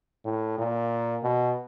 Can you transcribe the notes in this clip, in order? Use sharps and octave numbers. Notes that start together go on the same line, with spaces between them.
A2
A#2
B2